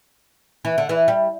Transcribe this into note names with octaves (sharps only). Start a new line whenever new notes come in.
E3
D3
E3
G3